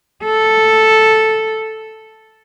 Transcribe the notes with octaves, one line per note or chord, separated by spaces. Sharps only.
A4